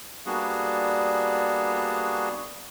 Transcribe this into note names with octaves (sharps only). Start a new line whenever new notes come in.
G3 A#3 B3 D4 F#4 G#4